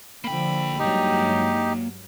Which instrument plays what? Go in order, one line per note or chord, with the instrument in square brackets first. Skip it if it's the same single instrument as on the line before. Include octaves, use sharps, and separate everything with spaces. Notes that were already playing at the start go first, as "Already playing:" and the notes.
[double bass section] D3 F3 [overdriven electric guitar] A#3 G5 [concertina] B5
[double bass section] G2 F#3 G#3 [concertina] D#4 G4